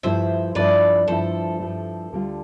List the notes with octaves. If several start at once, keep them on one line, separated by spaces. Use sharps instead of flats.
G2 F3 A3 E4 C5 E5
G2 F3 A3 E4 B4 D5
G2 F3 A3 E4 A4 C5
G2 F3 A3 E4
D2 D3 G3 D4 F4